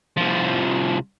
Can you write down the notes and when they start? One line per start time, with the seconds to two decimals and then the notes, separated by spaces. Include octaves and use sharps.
0.17 C2 F3